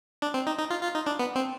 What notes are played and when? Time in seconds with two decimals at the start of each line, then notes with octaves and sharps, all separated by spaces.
0.22 D4
0.34 C4
0.47 D#4
0.58 D#4
0.70 F4
0.83 F4
0.95 D#4
1.06 D4
1.19 B3
1.35 C4